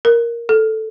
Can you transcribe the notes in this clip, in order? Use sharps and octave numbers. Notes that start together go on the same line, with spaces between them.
A#4
A4